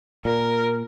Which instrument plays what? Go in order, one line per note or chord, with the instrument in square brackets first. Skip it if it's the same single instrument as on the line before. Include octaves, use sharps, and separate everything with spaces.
[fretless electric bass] A#2 [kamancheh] A#4